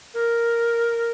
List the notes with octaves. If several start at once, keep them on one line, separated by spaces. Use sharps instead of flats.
A#4